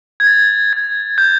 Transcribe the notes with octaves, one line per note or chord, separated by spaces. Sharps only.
G#6
A6
G#6
G6